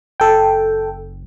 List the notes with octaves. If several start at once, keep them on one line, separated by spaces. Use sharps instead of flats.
F#1 A4 G5